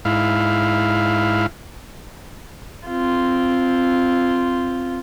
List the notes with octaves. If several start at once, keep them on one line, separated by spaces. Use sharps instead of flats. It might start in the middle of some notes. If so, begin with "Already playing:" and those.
G#2 E4 F5
C4 F4